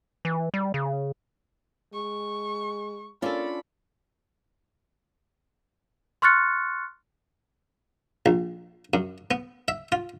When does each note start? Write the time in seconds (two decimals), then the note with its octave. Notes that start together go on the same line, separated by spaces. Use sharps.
0.25 E3
0.54 G3
0.74 C#3
1.94 G#3 C#6
3.22 A#3 C#4 D4 F4 A4 D5 B5
6.22 C6 C#6 F6 F#6 A6 C#7
8.26 A#1
8.94 F#2
9.31 B3
9.68 E5
9.92 F4